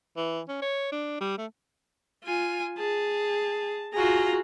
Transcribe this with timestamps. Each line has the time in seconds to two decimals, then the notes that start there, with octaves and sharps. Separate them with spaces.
0.17 E3
0.48 C#4
0.62 C#5
0.92 D4
1.21 G3
1.38 A3
2.24 F4 G#5
2.78 G#4 A5
3.93 F4 F#4 G#4 A#5